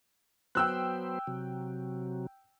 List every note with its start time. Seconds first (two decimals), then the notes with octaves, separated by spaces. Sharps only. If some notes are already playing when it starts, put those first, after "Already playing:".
0.55 F#3 B3 C5 G5 E6 F#6
1.27 C3 F#3